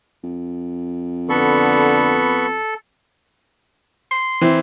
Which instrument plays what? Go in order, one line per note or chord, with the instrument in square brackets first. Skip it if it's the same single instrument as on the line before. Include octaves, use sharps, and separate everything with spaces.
[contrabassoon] F2
[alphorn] D3 [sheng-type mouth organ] B3 B5 C#6 [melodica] A4
[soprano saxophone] C6
[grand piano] E3 C4